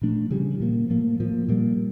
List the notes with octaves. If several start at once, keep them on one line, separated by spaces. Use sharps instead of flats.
A#2 F3 A3 D4
C#3 E3 G3
A#2 F3 A#3
A2 F3 A#3
A2 F3 A#3
A#2 G3 A#3